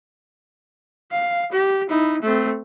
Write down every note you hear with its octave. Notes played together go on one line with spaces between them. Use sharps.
F5
G4
D#4 E4
A3 C4